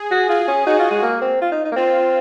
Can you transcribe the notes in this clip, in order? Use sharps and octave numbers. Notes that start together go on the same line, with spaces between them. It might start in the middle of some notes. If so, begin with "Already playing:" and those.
Already playing: G#4
F#4
F4 G#4
C#4
D#4 F#4
F4
G#3
A#3
C4
F4
D#4
D#4
A#3
C4 F4